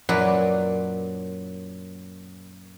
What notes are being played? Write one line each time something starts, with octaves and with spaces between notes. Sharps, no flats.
F#2 A#2 F#3 B4 C#5 D5